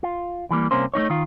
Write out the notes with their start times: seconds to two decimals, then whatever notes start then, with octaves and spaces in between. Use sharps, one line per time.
0.03 F4
0.51 E3 G3 A3 A#3
0.71 C2 C3 A#3 C#4 C5
0.94 A3 A#3 D#4 C#5
1.10 D#3 F4